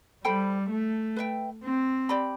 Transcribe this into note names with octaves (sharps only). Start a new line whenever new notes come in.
G3 A4 C5 G5 B5
A3
B4 E5 G5
C4
G4 D5 G5 B5